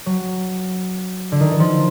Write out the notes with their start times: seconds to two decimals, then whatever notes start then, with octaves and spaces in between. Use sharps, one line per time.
0.06 F#3
1.32 D3
1.40 D#3
1.51 E3
1.60 F3